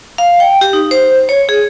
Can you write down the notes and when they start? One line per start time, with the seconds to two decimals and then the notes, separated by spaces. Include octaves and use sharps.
0.18 F5
0.40 G5
0.61 G4
0.73 D#4
0.91 C5
1.29 C#5
1.49 G#4